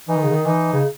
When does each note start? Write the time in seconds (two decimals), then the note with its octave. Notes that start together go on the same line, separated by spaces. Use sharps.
0.08 E3 D#4
0.16 D#3
0.24 C#3
0.31 D#3
0.46 E3 D#4
0.73 C#3